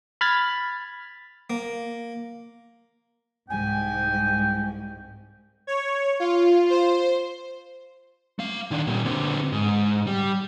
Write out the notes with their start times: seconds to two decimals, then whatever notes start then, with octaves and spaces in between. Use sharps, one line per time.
0.21 B5 F6 G#6 A6 B6
1.50 A#3
3.49 C2 G#2 G5 G#5
5.67 C#5
6.20 F4
6.70 C5
8.39 A3 F5
8.71 D#3 D4
8.87 A#2 G3
9.05 D3 C4
9.52 G#2
10.07 G3